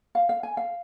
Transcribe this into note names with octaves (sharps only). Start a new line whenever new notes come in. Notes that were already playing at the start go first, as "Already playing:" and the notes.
F5
F5
G#5
F5